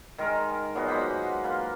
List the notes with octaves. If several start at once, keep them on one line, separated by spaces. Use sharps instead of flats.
D#3 G#3 A#4
A#2 F#3 G#3 B3
C5 F#5 B5 D6
A#3 F4 B4